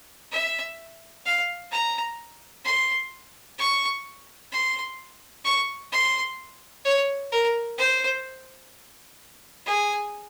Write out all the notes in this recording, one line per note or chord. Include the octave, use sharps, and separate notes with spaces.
E5
F5
A#5
C6
C#6
C6
C#6
C6
C#5
A#4
C5
G#4